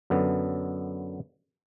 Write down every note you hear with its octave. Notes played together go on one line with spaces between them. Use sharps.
F#2 D3 B3